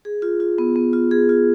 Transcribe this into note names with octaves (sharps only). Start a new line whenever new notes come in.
G#4
F4
F4
B3
B3
F4
G#4
F4